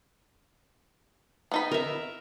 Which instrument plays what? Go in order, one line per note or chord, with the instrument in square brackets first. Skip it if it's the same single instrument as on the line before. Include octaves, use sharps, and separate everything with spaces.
[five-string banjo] B3 D#4 B5
[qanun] A#4 E5